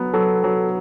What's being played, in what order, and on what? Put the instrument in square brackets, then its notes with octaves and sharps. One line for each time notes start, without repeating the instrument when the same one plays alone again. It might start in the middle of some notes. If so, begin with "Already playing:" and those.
Already playing: [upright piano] F#3 B3
[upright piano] F#3 [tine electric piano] A4
[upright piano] F#3